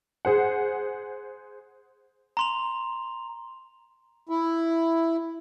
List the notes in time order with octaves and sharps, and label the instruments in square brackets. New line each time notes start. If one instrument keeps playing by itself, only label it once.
[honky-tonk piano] G#4 C5 F#5
[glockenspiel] A#5 C6 F7
[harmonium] E4